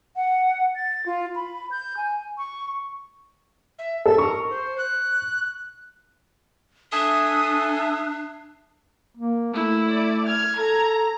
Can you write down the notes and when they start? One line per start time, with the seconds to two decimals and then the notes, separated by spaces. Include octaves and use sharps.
0.16 F#5
0.76 A6
1.06 F4
1.36 B5
1.71 G6
1.97 G#5
2.38 C#6
3.78 E5
4.05 A4 E6
4.18 A#4 C#6
4.49 C5
4.77 F#6
6.92 D4 A4 E5 G#5 D#6
9.17 A#3
9.54 A3 E4
9.89 D5
10.28 F6 G#6
10.57 A4 A#5